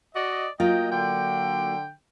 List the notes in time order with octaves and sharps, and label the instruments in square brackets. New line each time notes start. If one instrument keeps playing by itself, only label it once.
[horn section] F#4 D5 D#5
[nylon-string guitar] F#3 A#3 F4 [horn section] D#5 G5
[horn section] D3 G5